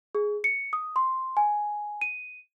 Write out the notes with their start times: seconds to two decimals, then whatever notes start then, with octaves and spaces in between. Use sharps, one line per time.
0.15 G#4
0.44 C#7
0.73 D#6
0.96 C6
1.37 G#5
2.01 D#7